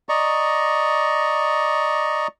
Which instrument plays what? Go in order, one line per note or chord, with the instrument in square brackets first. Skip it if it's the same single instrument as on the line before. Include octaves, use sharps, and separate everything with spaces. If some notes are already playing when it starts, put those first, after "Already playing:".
[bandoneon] D5 D#5 A#5 C#6